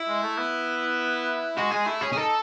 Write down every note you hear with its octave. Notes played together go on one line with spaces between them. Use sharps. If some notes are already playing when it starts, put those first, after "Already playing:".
Already playing: E4
G#3
A3
B3
G#3 F#4
G#3 G#4
A3 E4
C#4 G#4
G#4
D#4 A4